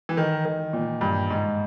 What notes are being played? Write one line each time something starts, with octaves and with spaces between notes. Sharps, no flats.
E3
D#3
D#3
A#2
G2
G#2